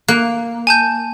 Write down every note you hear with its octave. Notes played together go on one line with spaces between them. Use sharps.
A#3 F#6
G#5 A5 G6